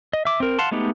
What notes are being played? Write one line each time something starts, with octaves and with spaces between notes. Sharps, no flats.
D#5
E5 D6
C4 A#4
F5 F#5 A5 C6
G#3 A3 B3 D#4 G4